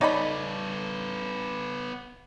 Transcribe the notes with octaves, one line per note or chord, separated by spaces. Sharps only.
B3 D#4 A4 C#5 D5 G5 B5